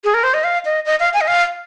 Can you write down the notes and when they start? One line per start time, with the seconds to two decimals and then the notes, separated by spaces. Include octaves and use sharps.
0.04 G#4
0.14 A#4
0.23 C5
0.34 D#5
0.44 F5
0.65 D#5
0.86 D#5
1.00 F5
1.14 G#5
1.21 D#5
1.27 F5